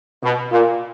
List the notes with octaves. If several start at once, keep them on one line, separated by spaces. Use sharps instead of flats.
B2
A#2